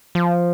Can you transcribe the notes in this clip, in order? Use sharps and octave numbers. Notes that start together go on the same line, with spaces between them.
F3